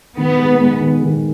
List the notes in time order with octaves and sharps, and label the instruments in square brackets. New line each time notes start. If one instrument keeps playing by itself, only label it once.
[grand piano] D#3 [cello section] B3
[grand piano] G#3
G#3
D#3
D#3